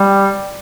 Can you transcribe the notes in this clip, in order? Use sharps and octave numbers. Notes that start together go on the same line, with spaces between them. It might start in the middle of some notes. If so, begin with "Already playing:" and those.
Already playing: G3